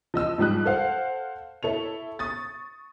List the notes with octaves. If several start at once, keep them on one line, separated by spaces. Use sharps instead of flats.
F3 D#5 E6
G#2 F3 G3 D#6 F#6
A4 C5 F5 F#5
E4 A4 C#5 F7
C#6 D#6 A6